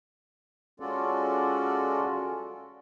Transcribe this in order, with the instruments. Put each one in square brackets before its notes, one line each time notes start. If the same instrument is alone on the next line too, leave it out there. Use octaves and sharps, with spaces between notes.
[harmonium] G#3 C#4 F4 F#4 A4 D5